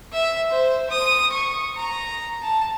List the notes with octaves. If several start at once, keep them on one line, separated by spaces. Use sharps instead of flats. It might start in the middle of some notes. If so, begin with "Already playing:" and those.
E5
C5
D#6
C#6
A#5
A5